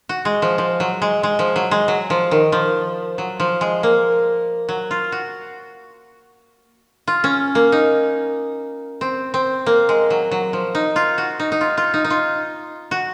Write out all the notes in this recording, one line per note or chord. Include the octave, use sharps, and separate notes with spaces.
F#4
G#3
F3
F3
F#3
G#3
G#3
F3
F#3
G#3
F#3
F3
D#3
F3
F#3
F3
G#3
A#3
F#3
F4
F#4
F4
C#4
A#3
D#4
C4
C4
A#3
G#3
F#3
F#3
F3
D#4
F4
F#4
D#4
D#4
F4
F4
D#4
D#4
F4
F#4